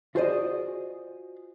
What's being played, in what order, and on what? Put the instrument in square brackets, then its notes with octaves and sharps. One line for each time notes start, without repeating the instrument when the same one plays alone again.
[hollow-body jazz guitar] F4 F#4 G#4 C5 D5 D#5